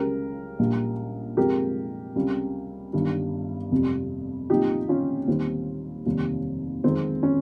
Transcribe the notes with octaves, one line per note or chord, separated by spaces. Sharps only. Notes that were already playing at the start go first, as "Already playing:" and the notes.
Already playing: C#2 C#3 G#3 G4 A#4
A#1 A#2 G3
F2 C3 F3 G#3 G4 A#4
C#2 C3 G3
G1 G2 D#3 G3
F1 F2 C3 G3
C2 A#2 F3 D#4 G4
C#4 F4
D#2 D#3 G3 C4
F1 D#2 D#3 G3
F2 D#3 G#3 C4
C#4